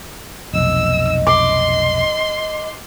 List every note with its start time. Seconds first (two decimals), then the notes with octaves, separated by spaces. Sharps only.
0.53 F1 B1 D#5 E6
1.27 C6 D6